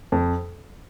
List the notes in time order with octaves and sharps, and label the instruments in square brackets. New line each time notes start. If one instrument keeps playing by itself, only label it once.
[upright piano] F2